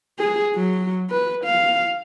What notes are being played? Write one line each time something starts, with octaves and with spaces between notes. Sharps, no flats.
G#4
F#3
B4
F5